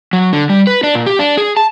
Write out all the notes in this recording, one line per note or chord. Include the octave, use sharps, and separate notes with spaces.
F#3
D3
G3
B4
D4
A#2
G4
D4
G#4
A5